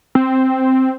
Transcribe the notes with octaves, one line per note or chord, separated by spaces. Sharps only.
C4